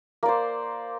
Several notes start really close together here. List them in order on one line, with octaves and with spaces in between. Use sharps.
A#3 D5 C5